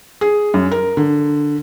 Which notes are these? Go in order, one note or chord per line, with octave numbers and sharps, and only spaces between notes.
G#4
F#2
A#4
D3